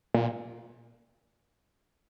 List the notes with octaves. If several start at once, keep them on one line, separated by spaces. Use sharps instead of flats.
A#2